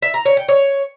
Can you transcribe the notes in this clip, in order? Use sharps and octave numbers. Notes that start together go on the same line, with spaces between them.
E5
A#5
C#5
G5
C#5